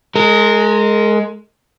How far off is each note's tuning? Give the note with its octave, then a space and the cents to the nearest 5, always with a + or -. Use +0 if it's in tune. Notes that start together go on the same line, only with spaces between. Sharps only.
G#3 +15 A#4 -25